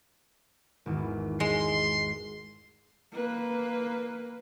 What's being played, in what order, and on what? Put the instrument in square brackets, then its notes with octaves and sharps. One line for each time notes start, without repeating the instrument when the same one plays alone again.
[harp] G#1 E2
[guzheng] G#3 [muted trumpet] C6
[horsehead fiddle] A#3 B4